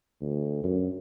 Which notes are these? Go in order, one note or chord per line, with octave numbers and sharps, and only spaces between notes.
D2
F#2